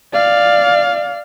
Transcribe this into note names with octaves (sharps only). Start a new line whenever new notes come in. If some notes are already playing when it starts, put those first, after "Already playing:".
D5 F5